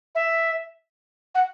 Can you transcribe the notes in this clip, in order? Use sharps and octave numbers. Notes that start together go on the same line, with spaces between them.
E5
F#5